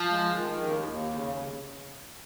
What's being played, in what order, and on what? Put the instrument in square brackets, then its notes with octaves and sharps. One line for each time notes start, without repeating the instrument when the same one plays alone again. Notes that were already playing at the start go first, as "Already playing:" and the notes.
Already playing: [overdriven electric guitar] F3
[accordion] G#3
D#3
D#2
D#2
C#3